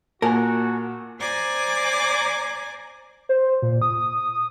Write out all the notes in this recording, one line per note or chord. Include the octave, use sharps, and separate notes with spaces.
A#2 A#3 F#4 A#4 G#5 A5
C5 D5 G#5 A#5 D6
C5
A#2
D#6